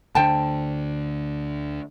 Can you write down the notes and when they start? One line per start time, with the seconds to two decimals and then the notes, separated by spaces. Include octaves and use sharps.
0.15 D2 D3 D4 C5 G5 A5